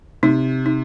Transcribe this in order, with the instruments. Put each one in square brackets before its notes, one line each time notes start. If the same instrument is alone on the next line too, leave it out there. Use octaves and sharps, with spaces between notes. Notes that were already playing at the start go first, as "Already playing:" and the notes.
[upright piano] C3 [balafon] D#4
[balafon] D#4